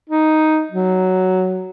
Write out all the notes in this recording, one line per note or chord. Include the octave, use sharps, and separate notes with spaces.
D#4
F#3